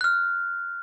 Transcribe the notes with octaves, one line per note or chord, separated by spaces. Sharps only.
F6 F#6